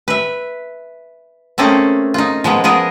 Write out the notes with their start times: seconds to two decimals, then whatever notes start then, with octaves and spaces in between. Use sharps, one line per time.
0.08 B4 E5
1.58 A3 A#3 C4 C#4 G#4 A4
2.14 D#4 F4
2.44 F3 G#3 A#3 B3
2.64 F3 B3 G#4 A#4 D#5